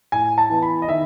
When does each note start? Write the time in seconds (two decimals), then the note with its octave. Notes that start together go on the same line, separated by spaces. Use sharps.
0.12 A2 G#5
0.38 A5
0.50 E3 B3
0.62 B5
0.82 D#5
0.88 D#3 E5